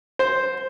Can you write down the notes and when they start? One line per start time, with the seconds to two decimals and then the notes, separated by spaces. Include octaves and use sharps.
0.19 C5